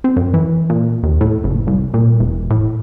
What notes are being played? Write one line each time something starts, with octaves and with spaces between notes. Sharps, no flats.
C4
F#2
E3
A#2
D#2
A2
F#1
C2
A#2
E1
A2